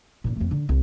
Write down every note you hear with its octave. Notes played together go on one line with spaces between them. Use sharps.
G2 A#2
F2 A3
D3
C2